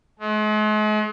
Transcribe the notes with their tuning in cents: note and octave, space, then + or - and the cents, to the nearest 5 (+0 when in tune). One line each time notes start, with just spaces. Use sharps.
G#3 +45